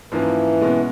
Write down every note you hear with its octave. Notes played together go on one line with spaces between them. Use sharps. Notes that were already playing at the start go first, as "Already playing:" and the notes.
G#2 E3 F3 A#3 C#4 E4
B2 G#3 C#4